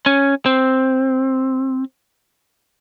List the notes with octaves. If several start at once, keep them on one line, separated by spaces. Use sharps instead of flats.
C#4
C4